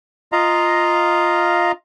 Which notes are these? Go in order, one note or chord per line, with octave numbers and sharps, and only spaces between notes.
F4 D#5 F5 A#5